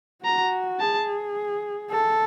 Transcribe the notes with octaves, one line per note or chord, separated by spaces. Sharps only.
F#4 A#5
G#4 A5
A4